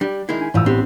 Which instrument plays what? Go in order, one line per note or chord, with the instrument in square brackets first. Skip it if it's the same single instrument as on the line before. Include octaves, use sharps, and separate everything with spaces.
[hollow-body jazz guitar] G3 [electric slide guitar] D4
[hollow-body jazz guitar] D#3 G#3 E4
[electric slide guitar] G#5
[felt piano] A1 E6 [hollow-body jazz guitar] G#2 F3 [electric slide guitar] E3
[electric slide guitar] B3 D4 G4 [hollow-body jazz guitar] C4